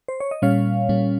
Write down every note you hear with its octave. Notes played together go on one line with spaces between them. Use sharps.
C5
C#5
D#5
A#2 G3 C#4 C#5 F5
A#2 G3 C#4